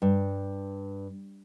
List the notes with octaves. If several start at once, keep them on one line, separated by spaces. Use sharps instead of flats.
G2